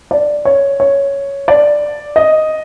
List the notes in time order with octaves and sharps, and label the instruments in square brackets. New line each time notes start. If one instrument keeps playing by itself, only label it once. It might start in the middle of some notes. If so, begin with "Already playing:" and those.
[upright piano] D5
C#5
C#5
D5
D#5